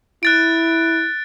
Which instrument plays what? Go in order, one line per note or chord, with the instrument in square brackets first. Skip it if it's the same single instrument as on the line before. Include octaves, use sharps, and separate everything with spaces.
[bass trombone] E4 [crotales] F#6 A6 D7